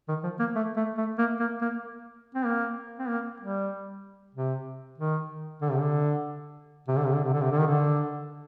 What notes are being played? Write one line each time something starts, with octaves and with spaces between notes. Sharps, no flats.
D#3
F3
A#3
A3
A3
A3
A#3
A#3
A#3
C4
A#3
C4
A#3
G3
C3
D#3
D3
C3
D3
C3
D3
C3
D3
C3
D3
C3
D3
D#3
D3